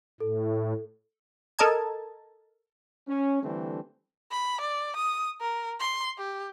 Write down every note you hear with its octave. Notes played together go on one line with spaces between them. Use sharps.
A2 A4
A4 A#4 D#5 A5 G#6
C#4
D3 E3 G3 A3 C4 D4
B5
D5
D#6
A#4
C6
G4